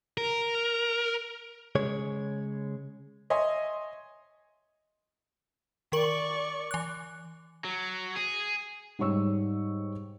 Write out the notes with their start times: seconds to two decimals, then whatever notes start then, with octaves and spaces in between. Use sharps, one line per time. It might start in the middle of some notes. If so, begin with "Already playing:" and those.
0.17 A#4
1.75 C#3 G#3 C#5
3.30 C#5 D#5 E5 G#5 C6
5.92 D#3 A#4 D5 C#6 F#7
6.71 E3 F#6
7.65 F#3
8.16 G#4
8.99 G#2 G3 C#5 C#6 E6